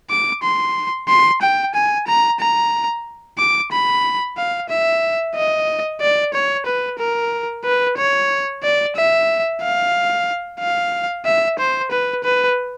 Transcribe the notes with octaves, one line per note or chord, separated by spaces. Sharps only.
D6
C6
C6
G5
G#5
A#5
A#5
D6
B5
F5
E5
D#5
D5
C#5
B4
A#4
B4
C#5
D5
E5
F5
F5
E5
C5
B4
B4